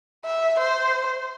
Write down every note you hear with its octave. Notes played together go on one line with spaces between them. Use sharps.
E5
C5